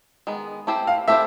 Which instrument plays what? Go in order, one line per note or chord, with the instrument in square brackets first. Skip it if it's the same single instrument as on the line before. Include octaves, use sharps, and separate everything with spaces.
[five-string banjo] D#3 G#3 B3
A3 C4 E4 G4 C5
[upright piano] F5
[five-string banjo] A3 C4 E4 G4 C5 [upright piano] E5